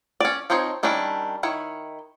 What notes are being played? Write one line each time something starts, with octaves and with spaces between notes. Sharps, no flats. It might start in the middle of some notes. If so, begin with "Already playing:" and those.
C#4 D5
F3 C4 D#4 C5 C#5
D#3 G3 C#4 D4 E4
D#3 E4 C#5